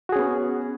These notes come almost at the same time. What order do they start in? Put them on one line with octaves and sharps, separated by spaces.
F#4 G#4 C#4 B3